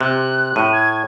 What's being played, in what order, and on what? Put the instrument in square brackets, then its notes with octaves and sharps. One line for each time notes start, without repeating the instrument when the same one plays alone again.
[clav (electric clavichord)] C3 [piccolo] F#6
[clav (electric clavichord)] A2 [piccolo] D#7
[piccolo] G#6